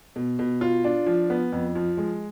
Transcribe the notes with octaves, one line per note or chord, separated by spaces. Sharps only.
B2
B2
F4
D4
F3
B3
F2
F3
G#3